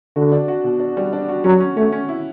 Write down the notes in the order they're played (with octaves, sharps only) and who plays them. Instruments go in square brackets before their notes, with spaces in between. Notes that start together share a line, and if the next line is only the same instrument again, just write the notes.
[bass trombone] D3 [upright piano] F#4
[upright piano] D4
F#4
B2
D4
G3
D4
F#4
[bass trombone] F#3 [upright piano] C#4
[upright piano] C#4
[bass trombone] A3 [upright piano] C#4
[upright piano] C#4
E4